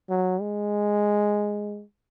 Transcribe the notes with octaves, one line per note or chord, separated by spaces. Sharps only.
F#3
G#3